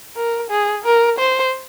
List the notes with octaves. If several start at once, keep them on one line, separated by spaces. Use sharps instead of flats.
A#4
G#4
A#4
C5